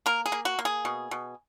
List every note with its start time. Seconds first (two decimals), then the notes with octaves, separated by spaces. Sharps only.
0.06 A#3 A#4
0.26 G#4
0.32 A#3
0.45 F#4
0.59 A#3
0.65 G#4
0.85 B2
1.11 B2